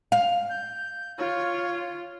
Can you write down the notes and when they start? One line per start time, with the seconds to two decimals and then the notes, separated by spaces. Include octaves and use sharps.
0.12 F5
0.50 G6
1.18 F4 C#5